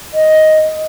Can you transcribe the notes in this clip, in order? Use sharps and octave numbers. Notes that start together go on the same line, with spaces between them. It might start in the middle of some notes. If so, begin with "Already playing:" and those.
D#5